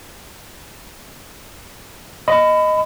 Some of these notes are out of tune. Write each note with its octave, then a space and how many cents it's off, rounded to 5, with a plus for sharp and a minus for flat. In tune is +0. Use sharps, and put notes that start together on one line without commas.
D#5 +0 B5 +25